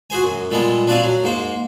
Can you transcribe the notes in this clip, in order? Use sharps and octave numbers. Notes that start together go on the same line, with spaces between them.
F#4 G#4 C5 G#5
F#2
A#2 G3 G#3 B3 A4
C4 D4 F#4 D5 F5 G#5
F#3
G#2 A#3 C5